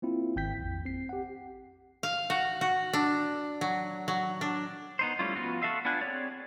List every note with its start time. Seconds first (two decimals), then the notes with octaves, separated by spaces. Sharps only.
0.02 A#3 C4 E4 F4
0.36 G#1 G5 G6 B6
0.59 A#1 F2
0.85 C4 C7
1.09 G4 F#5
2.03 F5
2.30 F#4
2.61 F#4
2.93 D4
3.61 F#3
4.08 F#3
4.41 D4
4.99 B3 D#4 C5
5.19 G3 A3 C#4 E4 F4
5.36 F3 B3 F4 F#4
5.62 F#4 A4 E5 F5 E6
5.85 B3 D4 F4 G#5 F#6
6.01 C4 G#4 C#5 D5